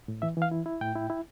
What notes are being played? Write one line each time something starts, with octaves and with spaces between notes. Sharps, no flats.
A2
E3 E5
E3 F5
E4
E4
A2 G5
E4
E4